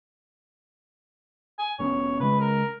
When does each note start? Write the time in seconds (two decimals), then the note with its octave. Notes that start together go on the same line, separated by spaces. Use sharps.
1.59 G#5
1.79 F1 B3 C#4 C#5
2.20 C#3 G#3 B4
2.40 A#4